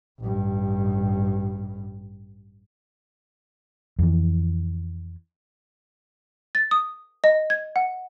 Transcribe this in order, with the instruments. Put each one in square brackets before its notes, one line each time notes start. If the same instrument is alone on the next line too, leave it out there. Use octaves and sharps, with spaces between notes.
[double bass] A1 G2
[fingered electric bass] F2 E3
[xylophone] A6
D#6
D#5
G#6
F#5